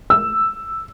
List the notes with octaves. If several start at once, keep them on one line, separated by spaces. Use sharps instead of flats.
E6